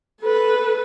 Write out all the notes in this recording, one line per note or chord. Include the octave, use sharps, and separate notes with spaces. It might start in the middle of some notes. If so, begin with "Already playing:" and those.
A4 B4